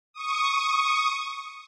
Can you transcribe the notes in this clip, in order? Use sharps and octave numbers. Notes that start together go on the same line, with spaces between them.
C#6 D#6